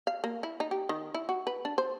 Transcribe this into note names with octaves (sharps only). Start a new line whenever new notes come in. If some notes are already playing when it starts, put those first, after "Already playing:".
F5
A#3
E4
D#4
G4
D#3
E4
F#4
B4
D4
C5